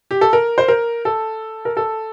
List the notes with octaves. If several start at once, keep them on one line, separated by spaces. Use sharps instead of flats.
G4
A4
A#4
C5
A#4
A4
A#4
A4